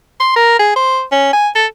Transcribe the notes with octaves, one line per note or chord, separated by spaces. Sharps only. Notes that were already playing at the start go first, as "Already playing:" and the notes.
C6
A#4
G#4
C5
C#4
G#5
A4